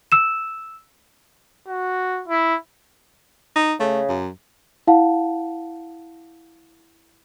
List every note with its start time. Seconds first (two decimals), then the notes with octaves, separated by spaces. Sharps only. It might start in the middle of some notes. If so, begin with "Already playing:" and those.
0.12 E6 E7
1.67 F#4
2.28 E4
3.56 D#4
3.80 C#3 A3
4.09 F#2
4.87 E4 F5 F#5 A5